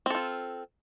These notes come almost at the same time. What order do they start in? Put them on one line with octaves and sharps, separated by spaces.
C4 A4 F4